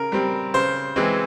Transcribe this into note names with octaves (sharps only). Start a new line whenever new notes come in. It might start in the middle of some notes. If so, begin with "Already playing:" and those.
Already playing: C#3 A#4
G3 C4
C#3 C5
E3 G#3 C4